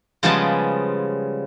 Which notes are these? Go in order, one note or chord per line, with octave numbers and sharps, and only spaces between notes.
C#3 F3 G3 G#3 B3 A5